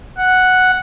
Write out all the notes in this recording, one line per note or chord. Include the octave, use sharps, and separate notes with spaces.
F#5